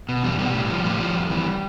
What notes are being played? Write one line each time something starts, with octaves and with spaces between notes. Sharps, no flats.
B2
E2 G3
B2 G3
A2
F3
A2 G3
F3
F2
E3